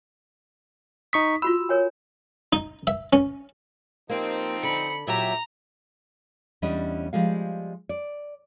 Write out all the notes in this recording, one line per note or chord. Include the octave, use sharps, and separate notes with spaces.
D#4 C#6 D#6 B6
F4 F#4 B5 E6
A#4 C#5 G#5
D#4
E5
C#4
F3 A#3 C4 D#4 G4
D3 B5 C#7
A#2 F#3 G4 E5 A#5
E2 G3 C#4 D4 D#5
F3 G3 G#3 F5
D5